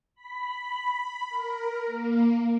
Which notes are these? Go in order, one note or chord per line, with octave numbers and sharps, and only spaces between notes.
B5
A#4
A#3